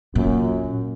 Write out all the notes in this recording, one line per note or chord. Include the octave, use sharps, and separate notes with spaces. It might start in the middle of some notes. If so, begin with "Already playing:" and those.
F#2 A#2